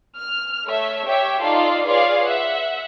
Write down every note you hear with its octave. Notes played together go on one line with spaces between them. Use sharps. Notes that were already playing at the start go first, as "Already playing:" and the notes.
F6
A3 C#5 E5
G4 C#5 E5 G5
D#4 F4 A4 D5 F5
F4 G#4 B4 C#5 D5 F5
E5 F#5